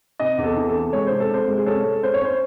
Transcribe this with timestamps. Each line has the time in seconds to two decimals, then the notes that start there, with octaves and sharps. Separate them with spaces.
0.20 C3 D#5
0.38 E2
0.44 A4
0.56 E3
0.69 A4
0.75 C3
0.93 G#3 C#5
1.07 C3 C5
1.20 A4
1.30 C3 C5
1.48 G#3
1.58 G#4
1.66 C#4 A4
1.85 G#3
2.03 C#4 C5
2.14 C#5
2.22 C#4 C5